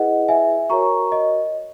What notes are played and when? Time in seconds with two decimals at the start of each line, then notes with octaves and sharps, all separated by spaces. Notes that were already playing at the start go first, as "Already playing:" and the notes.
Already playing: E4 G#4 B4 D#5 F#5
0.28 E5 G#5
0.70 F#4 A#4 C#5 A#5 C#6
1.12 D#5